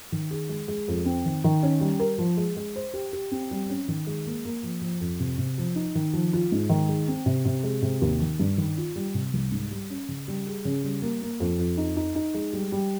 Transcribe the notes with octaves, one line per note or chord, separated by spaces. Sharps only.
D#3
G#4
G#3
G#3
F2
C4
D#3
D#3
C#4
G3
A#4
F3
G#3
G#3
C5
G4
G4
C4
G3
C#4
D#3
G#3
A#3
A#3
F3
F3
F2
C3
C3
F3
D#4
D#3
F3
F4
G#2
D#3
G#3
C4
C3
C3
G#3
C3
D#2
D#3
G2
D#3
F4
G3
C3
C2
G#2
G3
C#4
C#3
G3
G#4
C#3
G3
A#3
A#3
F2
F2
D#4
D#4
D#4
G#3
G3
G3